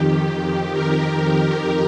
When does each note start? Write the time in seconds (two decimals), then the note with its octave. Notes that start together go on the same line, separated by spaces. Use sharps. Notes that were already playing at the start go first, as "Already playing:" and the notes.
Already playing: F2 D#3 G4
0.71 A#4